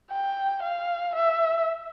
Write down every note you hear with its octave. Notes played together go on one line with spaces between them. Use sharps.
G5
F5
E5